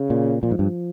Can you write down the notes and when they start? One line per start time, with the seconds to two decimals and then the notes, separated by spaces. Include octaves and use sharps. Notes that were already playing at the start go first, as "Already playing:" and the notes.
Already playing: C#3
0.10 A#2
0.43 A#2 F3
0.51 G#2
0.59 G2